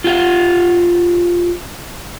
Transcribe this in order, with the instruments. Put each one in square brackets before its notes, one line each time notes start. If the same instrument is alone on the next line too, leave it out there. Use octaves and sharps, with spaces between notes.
[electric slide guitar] F4 G4 F5